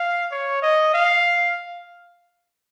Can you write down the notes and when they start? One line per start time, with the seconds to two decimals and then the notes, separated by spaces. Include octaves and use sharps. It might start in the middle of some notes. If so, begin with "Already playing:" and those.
Already playing: F5
0.32 C#5
0.62 D#5
0.94 F5